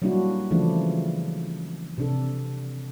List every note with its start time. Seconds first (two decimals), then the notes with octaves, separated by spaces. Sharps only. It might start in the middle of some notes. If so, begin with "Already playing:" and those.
0.02 F#3 G3 A#3 D4 E4 F#4
0.51 C#3 E3 F3 A3 D4 E4
1.98 C3 D4 A4